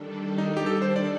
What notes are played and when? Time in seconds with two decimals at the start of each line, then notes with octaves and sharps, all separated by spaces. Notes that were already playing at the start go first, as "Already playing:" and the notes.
Already playing: D#3 G3 D4 A4
0.38 D#4
0.57 G4
0.66 A4
0.82 C5
0.96 D5